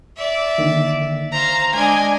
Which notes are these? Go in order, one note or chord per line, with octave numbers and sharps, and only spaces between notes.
D5 E5
D3 D#3 A#3
C5 F5 A#5
G#3 D4 D5 D#5 G#5